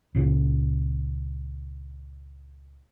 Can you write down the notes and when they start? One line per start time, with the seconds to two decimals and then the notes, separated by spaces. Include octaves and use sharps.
0.15 C#2 A#2 C#3